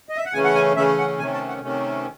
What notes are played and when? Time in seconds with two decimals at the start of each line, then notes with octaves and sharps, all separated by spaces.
0.09 D#5
0.17 E5
0.26 F#5
0.33 C#3 E3 A3 C#4 G#5
0.44 F#5
0.55 G#5
0.76 C#3 E3 A3 C#4 E5
0.99 F#5
1.19 C3 D#3 A3 C#4 G#5
1.34 A5
1.48 F#5
1.63 C3 D#3 A3 C#4